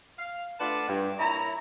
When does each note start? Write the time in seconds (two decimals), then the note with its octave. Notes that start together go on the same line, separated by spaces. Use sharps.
0.17 F5
0.59 A3 D4 F4 B4 F#5 A5
0.89 G2
1.19 A#2 E4 C#5 A#5